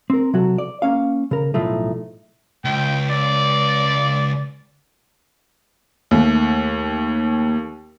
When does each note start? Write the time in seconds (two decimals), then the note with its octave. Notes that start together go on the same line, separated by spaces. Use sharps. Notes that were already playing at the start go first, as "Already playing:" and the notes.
0.10 C4 A#4
0.33 C3 F#3 F#4 A4
0.58 D5
0.82 A#3 C#4 F5
1.31 C#3 A#4
1.54 B1 A2 F3 A3 D#4
2.65 C#2 G5
3.11 D5
6.11 D#2 A3